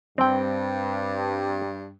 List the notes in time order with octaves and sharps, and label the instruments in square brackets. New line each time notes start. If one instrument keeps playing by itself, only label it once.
[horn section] G2 [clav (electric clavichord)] C4 G5